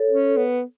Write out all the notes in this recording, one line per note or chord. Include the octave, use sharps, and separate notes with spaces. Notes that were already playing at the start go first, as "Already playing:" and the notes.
Already playing: A4 C#5
C#4
B3